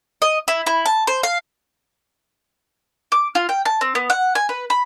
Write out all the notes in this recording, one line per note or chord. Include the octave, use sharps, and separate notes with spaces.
D#5
E4
E4
A5
C5
F5
D6
F4
G5
A5
C4
B3
F#5
G#5
B4
B5